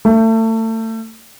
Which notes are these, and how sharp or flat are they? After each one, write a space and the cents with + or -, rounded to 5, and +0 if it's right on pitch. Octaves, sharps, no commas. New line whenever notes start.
A3 +30